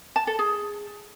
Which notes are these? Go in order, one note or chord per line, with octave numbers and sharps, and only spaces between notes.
A5
A4
G#4